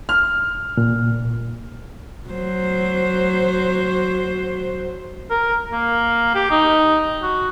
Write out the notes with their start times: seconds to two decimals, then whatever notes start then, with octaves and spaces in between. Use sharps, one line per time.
0.09 F6
0.77 A#2
2.30 F#3 C5
5.30 A#4
5.72 A#3
6.35 G4
6.51 D#4
7.23 F#4